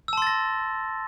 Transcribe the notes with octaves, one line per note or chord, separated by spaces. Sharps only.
A5 C6 E6 A6 A#6